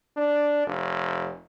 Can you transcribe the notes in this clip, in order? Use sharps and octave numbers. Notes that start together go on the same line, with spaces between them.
D4
F1